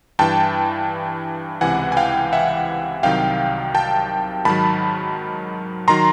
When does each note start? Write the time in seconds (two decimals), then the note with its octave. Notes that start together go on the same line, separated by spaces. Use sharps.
0.19 G2 E3 G5 A5
1.61 C#2 C3 E3 F#5 G#5
1.92 G#5
1.97 F5 G5
2.33 E5 F#5
3.03 C2 C3 D#3 F#3 F5 G5
3.75 G5 A5
4.45 G#2 D#3 F#3 A5 B5
5.88 D#3 F#3 A#5 C6